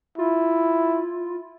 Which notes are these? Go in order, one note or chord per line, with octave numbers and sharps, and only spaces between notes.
E4 F4